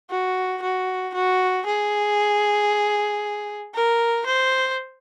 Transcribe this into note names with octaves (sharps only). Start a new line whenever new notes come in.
F#4
F#4
F#4
G#4
A#4
C5